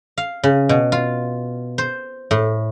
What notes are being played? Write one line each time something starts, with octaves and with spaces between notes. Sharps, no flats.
F5
C#3
B2
F4
C5
A2